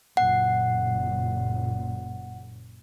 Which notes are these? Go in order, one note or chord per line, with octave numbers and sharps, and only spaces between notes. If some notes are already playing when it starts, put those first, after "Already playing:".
F#1 A#2 F#5